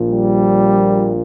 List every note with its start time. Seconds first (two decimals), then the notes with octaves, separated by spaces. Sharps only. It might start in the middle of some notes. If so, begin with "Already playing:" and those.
Already playing: A#1 A#2 F3
0.10 G3